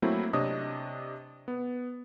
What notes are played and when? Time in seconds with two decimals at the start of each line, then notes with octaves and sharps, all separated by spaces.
0.02 F#3 A3 A#3 C4 E4
0.33 C3 D4 C#5 D#5 D#6
1.48 B3